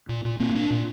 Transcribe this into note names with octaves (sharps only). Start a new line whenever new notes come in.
A#2
A#2
A#2 A#3 C4
A#2 D4
A#2